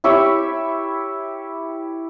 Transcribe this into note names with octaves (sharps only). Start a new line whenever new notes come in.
E4 G4 C#5 E5